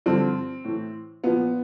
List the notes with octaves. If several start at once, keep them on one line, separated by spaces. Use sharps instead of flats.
G2 D3 F3 C4
A2 E3
A#2 F3 B3